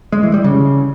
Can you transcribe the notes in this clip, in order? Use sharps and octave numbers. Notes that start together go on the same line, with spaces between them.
G#3
E3
G3
C#3